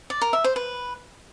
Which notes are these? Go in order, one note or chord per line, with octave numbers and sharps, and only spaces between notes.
D5
A#4
E5
C5
B4